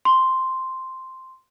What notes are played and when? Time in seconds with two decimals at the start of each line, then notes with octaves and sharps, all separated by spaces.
0.05 C6